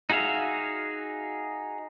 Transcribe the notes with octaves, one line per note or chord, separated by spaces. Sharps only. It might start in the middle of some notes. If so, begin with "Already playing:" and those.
D#4 F#4 G#4 E5 F5